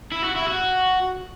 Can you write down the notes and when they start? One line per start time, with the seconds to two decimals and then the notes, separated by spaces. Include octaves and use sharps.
0.12 E4
0.24 F#4
0.36 E4
0.48 F#4